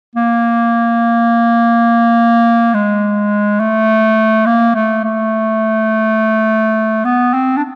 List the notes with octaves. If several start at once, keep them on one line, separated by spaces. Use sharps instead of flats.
A#3
G#3
A3
A#3
A3
A3
B3
C4
D4